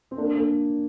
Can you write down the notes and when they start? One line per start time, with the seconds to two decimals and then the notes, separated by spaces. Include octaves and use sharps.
0.11 C4
0.18 A#3 D4
0.35 A#3 D4